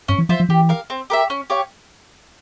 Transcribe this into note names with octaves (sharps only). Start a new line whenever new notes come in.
G2 C#4
E3
F3 F4 C5 E5
F3
E3 G4
A#4 F5
C4
G4 A#4 E5
C#4
G4 C#5 F5